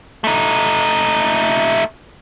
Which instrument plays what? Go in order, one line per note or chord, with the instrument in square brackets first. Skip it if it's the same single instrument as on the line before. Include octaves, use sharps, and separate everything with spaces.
[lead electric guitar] A3 D#4